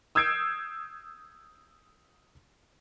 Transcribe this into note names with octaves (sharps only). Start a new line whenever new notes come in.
D#6 E6 G6 G#6 C7 D7